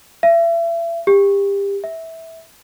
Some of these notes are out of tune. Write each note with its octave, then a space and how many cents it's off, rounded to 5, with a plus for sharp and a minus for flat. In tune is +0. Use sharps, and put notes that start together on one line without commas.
E5 +35
G4 +25
E5 -15